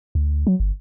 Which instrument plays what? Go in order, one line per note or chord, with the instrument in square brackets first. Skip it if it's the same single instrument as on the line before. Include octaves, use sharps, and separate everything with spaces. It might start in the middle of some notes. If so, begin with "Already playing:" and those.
[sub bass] D2
F#3
G1